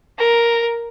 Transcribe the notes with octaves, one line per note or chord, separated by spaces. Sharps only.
A#4